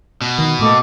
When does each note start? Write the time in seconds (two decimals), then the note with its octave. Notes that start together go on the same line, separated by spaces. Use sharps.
0.21 B2
0.38 D#3
0.59 A2 A3 A#3 A4 D#5 D6